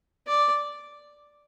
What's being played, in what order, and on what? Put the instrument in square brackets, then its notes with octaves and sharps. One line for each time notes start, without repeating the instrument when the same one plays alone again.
[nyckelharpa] D5